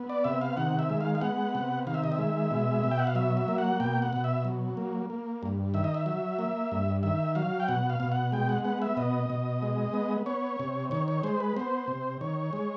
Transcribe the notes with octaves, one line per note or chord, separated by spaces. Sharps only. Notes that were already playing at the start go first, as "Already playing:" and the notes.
Already playing: B3
D5
C3 E5
F5
D#3 F#5
E5
G#3
F5
F5
B3 F#5
C3
D#3 F5
E5
D#5
E5
G#3
B2
B2
G5
F#5
F5
F#3 E5
E5
A#3
F#5
B2 G5
F#5
B2
E5
F#3
A#3
A#3
G2
D#3 E5
D#5
E5
F#3
A#3
G2
D#3 E5
F#3 F5
G5
B2 F#5
F5
B2
F#5
G#3 G5
F#5
B3 F#5
E5
B2 D#5
B2
G#3
B3
B3 C#5
C3
D#3 C#5
C#5
G#3 C5
B4
B3 C5
C3
D#3 C#5
G#3